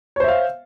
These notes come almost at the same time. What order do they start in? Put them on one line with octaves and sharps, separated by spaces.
C#5 C5 E5 F5